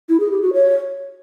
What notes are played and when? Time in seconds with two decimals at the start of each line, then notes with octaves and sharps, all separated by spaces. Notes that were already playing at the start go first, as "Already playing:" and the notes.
0.09 E4
0.20 G#4
0.31 G4
0.42 F#4
0.53 C#5